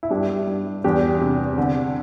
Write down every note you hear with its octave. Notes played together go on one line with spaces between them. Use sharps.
E4
G2 D4 G4
G2
E2 D4 G4
C3
D3